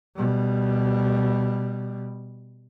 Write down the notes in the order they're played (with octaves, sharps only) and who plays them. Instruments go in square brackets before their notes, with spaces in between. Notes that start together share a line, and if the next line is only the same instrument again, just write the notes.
[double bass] B2 G3